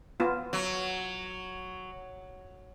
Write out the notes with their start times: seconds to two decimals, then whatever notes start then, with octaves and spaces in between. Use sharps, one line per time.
0.20 B3 F4
0.53 F#3